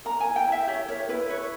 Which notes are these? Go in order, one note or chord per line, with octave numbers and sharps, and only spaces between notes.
A#4 A#5
G#5
E4
G5
E4 E5
G4 C#5
A#4 C#5
E4 B4
B4 C#5